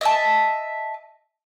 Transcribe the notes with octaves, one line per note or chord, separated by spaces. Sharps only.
D#5 E5 A5